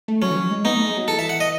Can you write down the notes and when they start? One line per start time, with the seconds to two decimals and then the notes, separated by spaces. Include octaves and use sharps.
0.08 A3
0.22 F#3 C#4
0.31 E3
0.36 F#3
0.51 G#3
0.65 B3 D#4
0.76 A3
0.86 G#3
0.97 F#3
1.08 E3 A4
1.19 E5
1.29 F#5
1.40 D#5